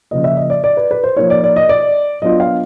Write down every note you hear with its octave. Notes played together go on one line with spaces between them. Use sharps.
C#3 F3 A#3 D#5
E5
D#5
D5
D5
B4
B4
C5
F3 A#3 D#4 C#5
D5
D5
D#5
D5
F#3 B3 D4 F4 D#5
F5